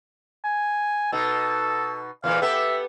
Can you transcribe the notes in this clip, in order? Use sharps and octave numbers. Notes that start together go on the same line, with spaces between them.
G#5
B2 D#4 A4
E2 A#2 E3 F5
B3 G4 A4 E5